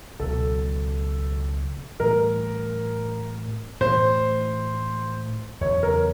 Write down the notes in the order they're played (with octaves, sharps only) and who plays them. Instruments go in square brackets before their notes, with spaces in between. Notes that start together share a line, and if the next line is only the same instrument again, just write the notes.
[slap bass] C#2 B2 F#3 [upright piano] A4
[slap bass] A2 E3 G3 [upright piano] A#4
[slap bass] A2 E3 A3 [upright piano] C5
[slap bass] E2 C#3 F#3 [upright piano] C#5
[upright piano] A#4